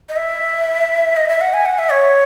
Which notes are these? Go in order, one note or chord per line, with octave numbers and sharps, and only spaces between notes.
D#5
E5
D#5
E5
F#5
G#5
F#5
E5
C#5